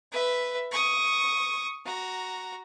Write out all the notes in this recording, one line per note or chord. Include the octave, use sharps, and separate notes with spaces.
B4 E5
C#6 D#6
F#4 A#5